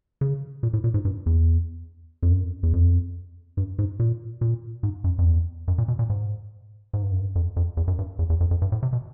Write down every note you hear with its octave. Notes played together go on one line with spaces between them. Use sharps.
C#3
A#2
A2
A#2
G#2
G2
E2
F2
F#2
E2
F2
G2
G#2
A#2
A#2
G#2
F#2
F2
E2
F#2
A#2
B2
A#2
G#2
G#2
G2
F#2
G2
F2
F2
E2
F#2
G2
E2
E2
F2
F2
G2
A2
C3
B2